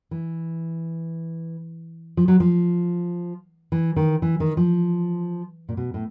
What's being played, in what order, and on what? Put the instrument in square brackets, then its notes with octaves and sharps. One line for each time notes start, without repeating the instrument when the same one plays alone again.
[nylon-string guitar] E3
F3
F#3
F3
E3
D#3
E3
D#3
F3
A#2
B2
A2